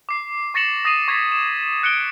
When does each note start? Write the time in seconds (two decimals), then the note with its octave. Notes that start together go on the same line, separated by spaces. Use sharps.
0.09 D6 C7
0.54 C#6 A6 A#6 C#7 E7 F#7
0.85 D#6 A#6 C7 D#7 F7
1.08 C#6 G#6 A6 B6 E7
1.32 E7
1.83 F#6 C#7 D7 G7